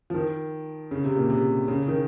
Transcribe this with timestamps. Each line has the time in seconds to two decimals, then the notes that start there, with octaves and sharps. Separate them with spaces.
0.10 F3
0.14 D#3
0.91 C#3
1.04 C3
1.16 A#2
1.30 C3
1.68 C#3
1.88 D#3